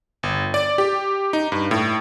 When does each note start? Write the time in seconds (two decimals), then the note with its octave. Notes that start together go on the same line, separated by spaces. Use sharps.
0.23 G1
0.54 D5
0.78 G4
1.33 D#4
1.52 G2
1.71 A2